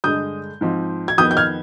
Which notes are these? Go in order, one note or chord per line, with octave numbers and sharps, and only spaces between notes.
G2 D3 G#3 D#6 G6
G#2 F3 C4
G#6
F2 D#3 B3 D#6 G6
G6
F6 G#6